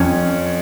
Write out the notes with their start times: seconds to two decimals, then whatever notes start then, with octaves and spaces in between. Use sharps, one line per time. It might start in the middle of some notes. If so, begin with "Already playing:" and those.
Already playing: F2 C#4